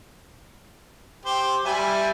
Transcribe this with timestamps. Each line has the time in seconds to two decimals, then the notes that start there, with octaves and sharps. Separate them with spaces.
1.25 G4 C5
1.65 G3 E5 G#5 B5